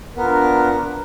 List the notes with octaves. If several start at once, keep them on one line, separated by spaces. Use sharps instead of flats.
B3 D4 F4 A#4